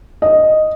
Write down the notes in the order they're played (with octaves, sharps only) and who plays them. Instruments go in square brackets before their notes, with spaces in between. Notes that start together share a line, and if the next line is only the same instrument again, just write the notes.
[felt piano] D#5